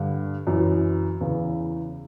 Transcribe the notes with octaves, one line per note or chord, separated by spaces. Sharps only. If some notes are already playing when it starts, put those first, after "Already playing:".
Already playing: G2 D3
F#2 E3
E2 C#3 E3